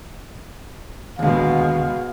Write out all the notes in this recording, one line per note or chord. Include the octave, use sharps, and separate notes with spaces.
D#2 B2 D3 G#3 F5